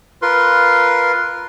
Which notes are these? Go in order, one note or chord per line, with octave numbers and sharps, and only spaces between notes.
F4 A#4 B4 C6